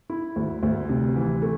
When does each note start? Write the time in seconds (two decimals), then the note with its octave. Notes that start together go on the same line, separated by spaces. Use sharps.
0.10 E4
0.36 D2
0.63 D2
0.89 C3
1.16 E3
1.42 A3